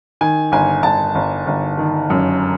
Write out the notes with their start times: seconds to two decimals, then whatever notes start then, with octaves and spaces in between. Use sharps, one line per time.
0.21 D#3 G#5
0.52 G1 G#5
0.83 G1 A5
1.15 G1
1.47 G1
1.78 D#3
2.10 F#2